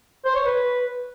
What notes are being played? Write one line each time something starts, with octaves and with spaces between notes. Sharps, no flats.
C5
C#5
B4